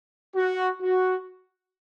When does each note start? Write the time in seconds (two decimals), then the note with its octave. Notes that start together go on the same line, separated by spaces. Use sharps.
0.35 F#4
0.81 F#4